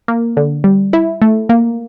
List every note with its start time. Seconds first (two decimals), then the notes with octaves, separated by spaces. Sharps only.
0.08 A#3
0.37 D3
0.64 G3
0.93 E4
1.22 A3
1.49 A#3